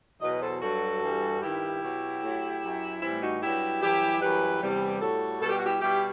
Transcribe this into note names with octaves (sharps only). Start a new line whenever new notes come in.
E2 B2 F#3 B4 D#5
A4 C5
G2 F#3 F#4 A4
G2 E3 G3
G2 D#3 G3 E4 G4
B2 F#3
A2 F#3
F#2 F#3
A2 E3 G3 C4 E4
D#4 F#4
G2 F#3 E4 G4
F#2 E3 G3 E4 G4
F#2 E3 G3 G4 B4
E2 C3 E3 G3
A2 G3 F#4 A4
B2 G3 A4
G4
F#4
E4 G4
B2 G3 E4 G4